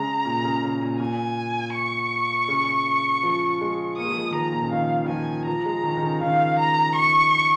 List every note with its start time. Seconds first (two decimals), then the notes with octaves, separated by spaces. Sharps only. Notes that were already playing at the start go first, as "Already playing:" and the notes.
Already playing: C#3 G#3 A#5
0.25 A#2
0.44 C#3
0.63 C#3
0.81 A#2
1.00 A#2 G#5
1.74 C#6
2.48 C#3
3.23 F3
3.61 G#3
3.98 A#3 D#6
4.05 G#3
4.12 F3
4.19 G#3
4.31 D#3
4.35 F3 A#5
4.52 A#2
4.62 C#3
4.72 D#3 F5
5.05 D#3
5.09 F3 G#5
5.46 F3 A#5
5.65 G#3
5.83 D#3
5.97 D#3
6.03 C#3
6.21 D#3 F5
6.59 A#5
6.95 C#6